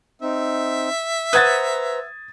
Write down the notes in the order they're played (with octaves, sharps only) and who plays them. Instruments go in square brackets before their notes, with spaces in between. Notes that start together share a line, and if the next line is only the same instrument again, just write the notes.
[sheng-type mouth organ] C4 D#4 [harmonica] E5
[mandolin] B4 C5 F#5 [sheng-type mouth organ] A#5 [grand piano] D#6 G#6 A6